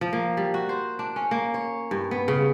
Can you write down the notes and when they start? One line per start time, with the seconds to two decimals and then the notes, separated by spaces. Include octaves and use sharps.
0.01 F3
0.13 A#3
0.37 G3
0.54 F#4
0.69 C5
0.99 D4
1.16 C#4
1.31 A#3
1.54 C#5
1.91 G2
2.11 B3
2.28 C#3